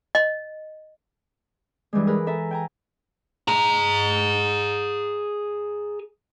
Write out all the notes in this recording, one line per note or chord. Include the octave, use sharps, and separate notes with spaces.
D#5
G2 E3 G3 G#3
G#4 A#4 B4
A4 E5 G#5 A#5
G5 G#5 A#5
G#4 A#5